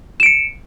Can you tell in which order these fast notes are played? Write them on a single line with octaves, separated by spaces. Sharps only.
E7 D7 C#7